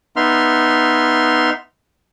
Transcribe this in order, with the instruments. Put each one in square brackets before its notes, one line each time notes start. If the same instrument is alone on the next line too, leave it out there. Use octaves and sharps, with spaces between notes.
[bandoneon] B3 D#4 E5 C6 F6